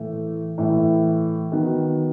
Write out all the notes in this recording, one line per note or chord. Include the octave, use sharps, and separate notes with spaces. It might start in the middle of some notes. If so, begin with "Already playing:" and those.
Already playing: A2 E3 A3
A2 E3 A3
D#3 F#3 B3